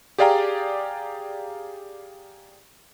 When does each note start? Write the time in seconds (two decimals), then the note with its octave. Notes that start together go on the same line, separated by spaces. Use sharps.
0.18 G4 G#4 D5 F5 G5 A#5